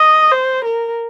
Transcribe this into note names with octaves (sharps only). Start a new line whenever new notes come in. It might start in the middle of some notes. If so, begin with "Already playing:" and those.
Already playing: D#5
C5
A#4